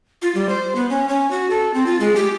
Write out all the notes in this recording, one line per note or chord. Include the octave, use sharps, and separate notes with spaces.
F4
G3
C5
B3
C#4
C#4
F#4
A4
C4
F4
G#3
G4